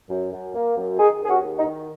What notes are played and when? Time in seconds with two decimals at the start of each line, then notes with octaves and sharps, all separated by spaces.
0.09 F#2
0.32 F#2
0.54 A#3
0.76 F#2
0.98 D#3 D#4 G#4
1.22 D#2 G#4
1.28 C#4 F#4
1.44 D#2
1.58 D#4
1.66 D#3